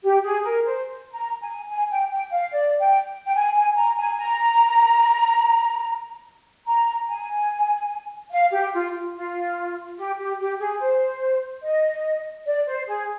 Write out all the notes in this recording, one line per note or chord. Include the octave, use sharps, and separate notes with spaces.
G4
G#4
A#4
C5
A#5
G#5
G#5
G5
G5
F5
D5
G5
G5
G#5
G#5
A#5
G#5
A#5
A#5
G#5
F5
G4
F4
F4
G4
G4
G4
G#4
C5
D#5
D5
C5
G#4